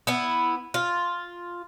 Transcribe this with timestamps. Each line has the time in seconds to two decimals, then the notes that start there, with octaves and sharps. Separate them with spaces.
0.07 B3 E4
0.74 F4